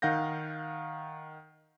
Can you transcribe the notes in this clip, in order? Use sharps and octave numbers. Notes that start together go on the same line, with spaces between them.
D#3 F5 F#5 G6 A#6